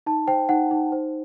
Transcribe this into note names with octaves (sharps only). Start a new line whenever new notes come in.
D#4 A5
C5 G5
D#4 F#5
D#4
C5